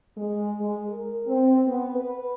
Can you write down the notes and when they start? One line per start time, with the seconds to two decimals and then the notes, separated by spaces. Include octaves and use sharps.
0.17 G#3
0.59 G#3
0.89 A#4
1.27 C4
1.67 B3
1.95 B4